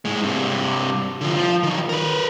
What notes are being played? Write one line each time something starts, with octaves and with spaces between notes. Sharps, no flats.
A2 G#3
G2 C3
D3 F3
F3
D#3 F#3
A#4 B4